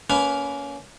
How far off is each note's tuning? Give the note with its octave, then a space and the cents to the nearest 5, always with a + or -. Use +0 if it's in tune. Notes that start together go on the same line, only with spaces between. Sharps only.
A#3 +0 C#4 +20 B4 +0